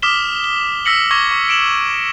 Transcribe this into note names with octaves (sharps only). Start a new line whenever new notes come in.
D6 D#6 F6 B6 E7 G7
G7
E6 A#6 B6 C#7 F#7
C#6 D6 G#6 A#6 G7
C#6
D7 E7 F#7